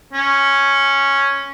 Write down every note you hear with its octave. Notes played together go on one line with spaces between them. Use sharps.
C#4